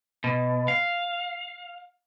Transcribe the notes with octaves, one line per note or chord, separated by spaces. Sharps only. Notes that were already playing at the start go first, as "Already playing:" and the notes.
B2
F5